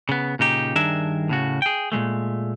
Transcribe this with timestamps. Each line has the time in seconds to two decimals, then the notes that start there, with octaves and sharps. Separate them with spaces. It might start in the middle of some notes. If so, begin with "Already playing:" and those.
0.09 C#3 B3
0.39 A#2 C#3 D#4 G4
0.76 G2 D#3 D4 G#4 A#4 E5
1.29 A2 C#3 F#4
1.62 G#4 G5
1.92 A#2 E3 G#3 A3